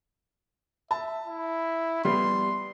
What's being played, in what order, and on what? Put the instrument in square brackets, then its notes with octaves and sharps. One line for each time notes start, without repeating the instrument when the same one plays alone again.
[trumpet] E5 [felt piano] A5
[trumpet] E4
[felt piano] G3 B3 [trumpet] C6